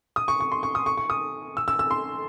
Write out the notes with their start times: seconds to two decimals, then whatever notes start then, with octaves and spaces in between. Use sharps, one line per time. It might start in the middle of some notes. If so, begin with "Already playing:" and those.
0.16 D#6
0.28 C#6
0.40 C#6
0.52 C6
0.63 C#6
0.75 D#6
0.86 C#6
0.97 C#6
1.10 D#6
1.57 E6
1.68 E6
1.79 E6
1.91 C6